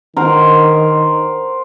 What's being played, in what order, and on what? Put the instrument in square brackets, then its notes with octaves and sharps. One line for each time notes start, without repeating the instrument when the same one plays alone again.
[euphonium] D#3 [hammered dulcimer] A#4 C5 F#5